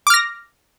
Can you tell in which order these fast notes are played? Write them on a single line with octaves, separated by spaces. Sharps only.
D6 F6 A#6